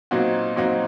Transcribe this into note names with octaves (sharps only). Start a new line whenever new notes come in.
A#2 F#3 C4 D#4 F#4
A#2 F#3 C4 D#4 F#4